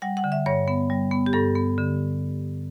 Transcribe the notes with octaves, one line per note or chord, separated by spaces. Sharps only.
G3 F#5
F#5
D3
E5
G2 C#5
B3
G3
B3
G4
G2 A4
B3
D3